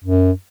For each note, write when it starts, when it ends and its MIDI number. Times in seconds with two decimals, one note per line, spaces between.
0.05 0.31 42